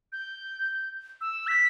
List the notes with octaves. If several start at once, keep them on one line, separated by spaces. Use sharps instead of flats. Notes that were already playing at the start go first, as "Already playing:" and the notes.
G6
E6
B6